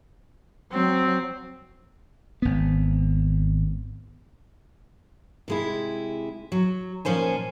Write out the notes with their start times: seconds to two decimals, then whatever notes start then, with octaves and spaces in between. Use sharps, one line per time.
0.72 F#3 C4
2.42 G#1 B3
5.48 C3 G#3 E4
6.52 F#3
7.05 A#2 F3 C#4 C5 G#5